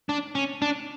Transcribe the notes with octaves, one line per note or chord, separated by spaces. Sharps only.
D4
C#4
D4